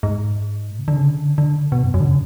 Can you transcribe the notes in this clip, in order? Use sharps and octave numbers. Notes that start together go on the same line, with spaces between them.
G#2
A2
C#3
D3
C#3
D3
D3
B2
F#2
F#2
D3
C#3